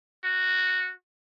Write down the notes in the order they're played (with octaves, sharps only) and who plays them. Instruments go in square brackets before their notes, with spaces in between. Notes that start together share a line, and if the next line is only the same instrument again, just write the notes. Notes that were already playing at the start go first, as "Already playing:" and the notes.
[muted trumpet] F#4